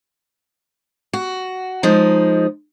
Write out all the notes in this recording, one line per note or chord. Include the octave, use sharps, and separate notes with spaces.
F#4
F3 G#3 D#4